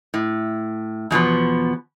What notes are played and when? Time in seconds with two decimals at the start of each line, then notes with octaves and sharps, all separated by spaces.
0.14 A2
1.11 E2 B2 F3 B3